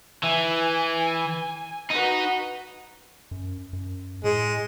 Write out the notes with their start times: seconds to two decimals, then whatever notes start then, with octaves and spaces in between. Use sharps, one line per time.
0.23 E3 G#5
1.91 D#4 F#4 B4
3.31 F#2
3.73 F#2
4.24 A2 G#3